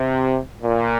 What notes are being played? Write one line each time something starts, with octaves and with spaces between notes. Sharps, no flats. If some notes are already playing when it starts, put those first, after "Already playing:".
Already playing: C3
A#2